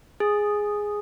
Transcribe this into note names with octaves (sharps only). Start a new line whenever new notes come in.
G#4